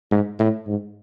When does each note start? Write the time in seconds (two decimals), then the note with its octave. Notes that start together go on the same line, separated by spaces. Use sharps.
0.11 G#2
0.39 A2
0.67 G#2